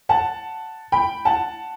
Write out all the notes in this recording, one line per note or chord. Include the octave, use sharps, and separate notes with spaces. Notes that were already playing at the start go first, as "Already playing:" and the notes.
F#5 A5
G5 B5
F#5 A5